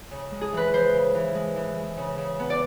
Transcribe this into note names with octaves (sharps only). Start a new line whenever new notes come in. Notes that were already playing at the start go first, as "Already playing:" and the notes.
C#3
G#3
G#4
E3 B4
E3 C5
C#3
E3
G#3
E3
G#3
C#3
C#3
B3
D5